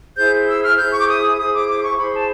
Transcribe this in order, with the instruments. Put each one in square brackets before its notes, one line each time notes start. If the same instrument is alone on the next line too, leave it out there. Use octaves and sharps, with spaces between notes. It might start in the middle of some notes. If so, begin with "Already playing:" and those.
[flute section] E4 G#4 C5 G6
E6
F6
E4 G#4 C5 G6
C#6
D6
D#6
E4 G#4 C5 D#6
D6
D6
C#6
E4 G#4 C5 B5
A5